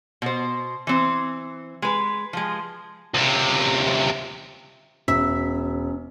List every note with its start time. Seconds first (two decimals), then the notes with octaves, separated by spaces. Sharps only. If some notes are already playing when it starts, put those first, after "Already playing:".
0.22 B2 C5
0.87 E3 C4
1.82 G#3 B4
2.33 F3 G#3
3.14 C#2 C3
5.08 E1 C#4 E5